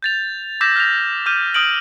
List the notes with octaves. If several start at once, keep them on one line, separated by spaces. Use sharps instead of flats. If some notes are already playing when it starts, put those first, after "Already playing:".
G6 A6 F7
D6 E6 G6 A#6 B6 E7
F6 G6 A#6 B6 F7
D6 F6 G6 D#7
D#6 F6 G6 D7 F#7